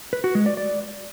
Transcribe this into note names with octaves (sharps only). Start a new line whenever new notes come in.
B4
F#4
G#3
D5
D5